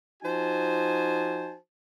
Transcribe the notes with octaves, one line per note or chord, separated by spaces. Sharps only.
F3 D#4 F#4 C5 G#5 A5